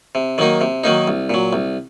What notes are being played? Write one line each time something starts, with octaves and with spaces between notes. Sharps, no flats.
C3
D#3 F#3 A#3 D#4
C3
D#3 F#3 A#3 D#4
C2
A#2 F#3
C2